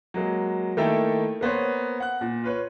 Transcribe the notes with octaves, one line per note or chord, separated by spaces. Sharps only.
F#3 G#3 A#3
D#3 A3 A#3 E4 A4 G5
A#3 B3 C5 C#5
F#5 F#6
A#2
F4 B4 C#5